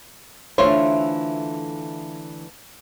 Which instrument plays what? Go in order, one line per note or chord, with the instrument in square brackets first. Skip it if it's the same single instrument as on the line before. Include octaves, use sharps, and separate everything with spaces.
[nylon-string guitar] D3 E3 A3 [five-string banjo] F4 C5 C#5